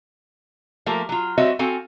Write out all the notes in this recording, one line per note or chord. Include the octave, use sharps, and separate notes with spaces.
F3 A3 A#3 G4 A#4
F#3 F4
G3 C4 F#4 C#5 D#5 E5
C4 F#4 A4 F5 G#5